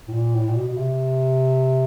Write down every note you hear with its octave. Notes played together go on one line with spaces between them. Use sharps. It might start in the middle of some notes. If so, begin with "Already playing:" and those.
A2
A#2
A2
A#2
B2
B2
C3